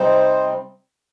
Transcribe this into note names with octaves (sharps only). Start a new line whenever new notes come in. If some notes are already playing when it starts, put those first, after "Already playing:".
Already playing: C3 G3 C4 D#4 C5